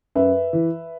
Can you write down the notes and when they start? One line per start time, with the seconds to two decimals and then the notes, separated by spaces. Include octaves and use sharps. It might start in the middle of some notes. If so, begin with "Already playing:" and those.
0.15 F#2 B4 E5
0.53 E3